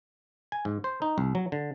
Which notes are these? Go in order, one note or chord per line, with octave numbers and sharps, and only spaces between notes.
G#5
G#2
C5
D#4
C2
F#3
D3